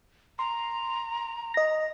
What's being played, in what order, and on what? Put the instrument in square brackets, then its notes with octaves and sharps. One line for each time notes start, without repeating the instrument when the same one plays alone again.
[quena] A#5 [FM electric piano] C6
[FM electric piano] D#5 A#6